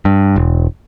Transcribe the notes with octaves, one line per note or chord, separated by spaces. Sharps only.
G2
E1